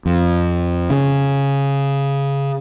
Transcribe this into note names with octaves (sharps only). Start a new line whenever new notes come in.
F2
C#3